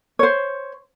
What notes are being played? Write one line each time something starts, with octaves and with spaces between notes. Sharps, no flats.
C5 C#5